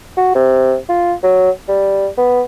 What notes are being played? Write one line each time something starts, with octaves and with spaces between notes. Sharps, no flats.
F#4
C3
F4
F#3
G3
B3